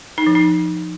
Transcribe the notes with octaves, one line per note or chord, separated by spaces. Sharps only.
D#4
F3
D#4